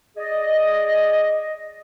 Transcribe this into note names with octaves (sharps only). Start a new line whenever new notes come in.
G#4 D5 D#5